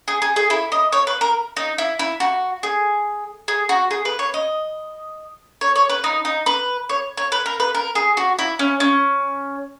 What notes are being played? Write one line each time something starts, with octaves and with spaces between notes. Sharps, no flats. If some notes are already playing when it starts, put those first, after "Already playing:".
G#4
G#4
G#4
E4
D#5
C#5
B4
A#4
D#4
E4
E4
F#4
G#4
G#4
F#4
G#4
B4
C#5
D#5
C#5
C#5
B4
D#4
D#4
B4
C#5
C#5
B4
A#4
B4
A#4
G#4
F#4
E4
C#4
C#4